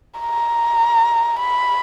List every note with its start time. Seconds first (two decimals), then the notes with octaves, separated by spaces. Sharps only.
0.20 A#5
1.39 B5